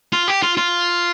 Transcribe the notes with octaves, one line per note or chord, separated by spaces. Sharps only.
F4
G4
F4
F4